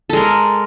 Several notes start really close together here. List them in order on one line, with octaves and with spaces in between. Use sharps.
A4 G#3 A#4